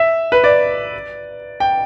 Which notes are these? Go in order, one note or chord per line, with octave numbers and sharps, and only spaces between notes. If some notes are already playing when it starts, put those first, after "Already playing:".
Already playing: E5
B4
D5
G5